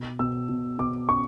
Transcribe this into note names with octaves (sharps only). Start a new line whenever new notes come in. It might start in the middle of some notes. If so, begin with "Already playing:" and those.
Already playing: B2
B2 E6
B2
B2 D6
C#4 C#6